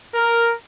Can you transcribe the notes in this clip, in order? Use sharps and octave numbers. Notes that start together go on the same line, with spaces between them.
A#4